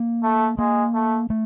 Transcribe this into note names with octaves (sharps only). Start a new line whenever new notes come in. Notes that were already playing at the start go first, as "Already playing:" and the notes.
Already playing: A#3
A3
G#3 A#3
A3
A3